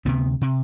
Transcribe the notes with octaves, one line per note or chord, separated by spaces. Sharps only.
D2 C3 B3
C3